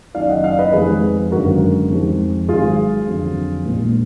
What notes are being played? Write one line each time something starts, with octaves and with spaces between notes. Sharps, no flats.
F#1 F#2 D#3 D5 F5
D#5 F#5
D5 F5
B4 D#5
F2 D#3 G#3 G#4 B4
G#1 F#2 D3 G#3 F#4 A#4
F2 D#3 G#3
G#1 G#2 F#3 F4 G#4
F2 D3 F#3
A#1 A#2 F3 G#3